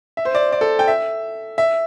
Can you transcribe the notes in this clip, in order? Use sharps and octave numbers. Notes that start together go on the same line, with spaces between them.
E5
C5
D5
D5
A4
G5
E5
E5